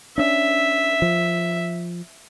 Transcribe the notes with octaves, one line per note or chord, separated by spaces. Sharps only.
C#4 D4 E5
F3